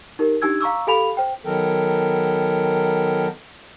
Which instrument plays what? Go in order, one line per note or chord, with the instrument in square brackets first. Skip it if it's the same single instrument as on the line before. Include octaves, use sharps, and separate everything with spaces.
[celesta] D#4 G4 A#4
D4 D#4 G4 G#5 E6 G#6
F5 A#5 C#6 D6 E6
G4 A4 F5 G#5 B5 F7
C5 G5
[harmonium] D#3 F#3 B3 A4 A#4 G5